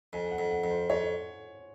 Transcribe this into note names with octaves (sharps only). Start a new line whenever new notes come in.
F2 G#5
F#5
F2
F#5
F2
C5
F2 C#5